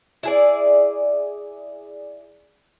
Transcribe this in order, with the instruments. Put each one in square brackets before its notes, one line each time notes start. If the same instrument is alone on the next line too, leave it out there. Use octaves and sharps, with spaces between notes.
[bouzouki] E4 G#4 D5